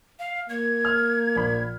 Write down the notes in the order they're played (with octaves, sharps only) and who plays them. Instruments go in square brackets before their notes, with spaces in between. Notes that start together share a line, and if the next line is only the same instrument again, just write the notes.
[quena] F5
[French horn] A#3 [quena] G#6
[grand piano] F6
A#1 B5